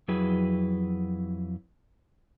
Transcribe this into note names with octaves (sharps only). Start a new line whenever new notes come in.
F2 F#3 E4 G#4 B4 G5